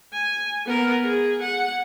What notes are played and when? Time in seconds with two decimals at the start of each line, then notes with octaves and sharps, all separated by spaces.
0.13 G#5
0.66 B3 A#4
1.04 G#4
1.41 F#5